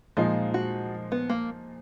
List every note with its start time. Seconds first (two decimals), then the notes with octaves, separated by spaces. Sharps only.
0.17 A#2 F3 G#3 D#4 F4
0.54 F#4
1.12 B3
1.30 A#3